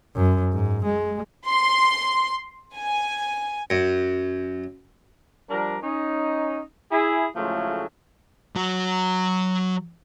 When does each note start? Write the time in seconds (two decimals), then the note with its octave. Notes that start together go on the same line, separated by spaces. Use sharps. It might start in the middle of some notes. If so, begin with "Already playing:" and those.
0.16 F#2
0.52 G#2
0.86 G#3
1.46 C6
2.77 G#5
3.70 F#2
5.49 F3 G3 D4 A#4
5.82 C#4 D#4
6.91 E4 G#4
7.35 A2 C#3 F3 F#3 G#3 A3
8.56 F#3 F#4